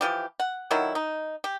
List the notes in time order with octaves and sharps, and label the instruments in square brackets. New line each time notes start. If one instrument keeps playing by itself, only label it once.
[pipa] E3 F3 G4
F#5
D3 D#3 F#3 E4
D#4
G4